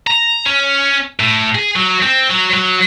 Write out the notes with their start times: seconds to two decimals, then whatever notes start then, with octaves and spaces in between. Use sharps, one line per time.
0.07 A#5
0.46 C#4
1.20 A2
1.55 G#4
1.76 F#3
2.02 C4
2.30 F#3
2.54 F#3